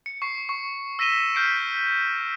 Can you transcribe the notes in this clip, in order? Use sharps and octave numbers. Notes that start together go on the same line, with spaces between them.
C#7
C#6 C7
C#6
E6 A#6 B6 D#7 E7 G7
F6 G6 B6 C7 D7